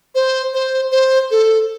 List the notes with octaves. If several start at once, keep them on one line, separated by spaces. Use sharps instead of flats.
C5
C5
C5
A4